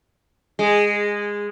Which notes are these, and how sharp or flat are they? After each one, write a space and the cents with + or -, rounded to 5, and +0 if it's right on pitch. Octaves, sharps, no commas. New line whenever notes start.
G#3 -15